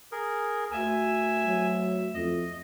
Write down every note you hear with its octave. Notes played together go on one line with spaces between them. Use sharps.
G#4 A#4
D2 E5 G#5
F#3
F2 D#5